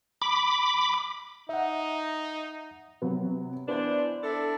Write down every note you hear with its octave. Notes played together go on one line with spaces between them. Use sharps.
B5 D6
D#4 E5 F#5
C3 F#3 B3
E3 B3 D4 C5
D4 E4 A4